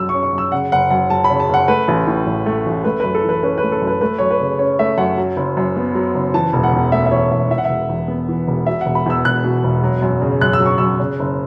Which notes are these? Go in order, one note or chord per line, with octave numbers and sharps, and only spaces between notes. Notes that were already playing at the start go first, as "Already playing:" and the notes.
Already playing: F#2 F#3 E6
C#6
C#4
C#6
F#2
E6
C#3 F#5
F#1 F#5
F#2 F#5
F#3 A5
B5
C#3
A5
F#1 F#5
A3 B4
A1
A2
A1
A3
A1
A3 B4
F#2 B4
A4
E3
B4
C#4 B4
B4
A3
A4
F#2
B4
A3 B4
F#2 C#5
B4
C#3
C#4 C#5
A3 E5
F#2 F#5
F#3
F#1
F#2
B3
F#3
F#1
E3 A5
E1
F#5
E2
A3 E5
E5
E3 C#5
E1 E5
E3 E5
F#5
E1 E5
E2
B3
E3
E1
B2 E5
E1 F#5
B5
E2 E6
E1 F#6
B2
E1
F#3
F#2
C#3
F#2 F#6
E6
F#3
C#6
F#2 E6
C#3
F#1